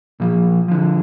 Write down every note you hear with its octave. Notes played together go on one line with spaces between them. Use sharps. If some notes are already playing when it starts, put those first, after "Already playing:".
A#2 F3
D3 F3